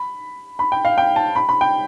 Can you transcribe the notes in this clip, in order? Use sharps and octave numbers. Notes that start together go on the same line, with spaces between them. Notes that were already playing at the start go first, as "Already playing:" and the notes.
Already playing: B5
B5
G5
F5
G5
A5
B5
B5
G5